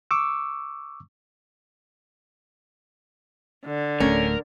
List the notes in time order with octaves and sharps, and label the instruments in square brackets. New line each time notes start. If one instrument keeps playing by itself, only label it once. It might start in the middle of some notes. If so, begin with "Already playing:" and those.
[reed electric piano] C#6 D6 E6
[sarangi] D3
[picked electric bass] D1 D#2 A3 [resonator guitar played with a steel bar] C#4 [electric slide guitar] A#4